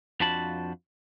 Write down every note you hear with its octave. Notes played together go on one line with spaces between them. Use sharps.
F2 F3 D4 F#4 A5 B5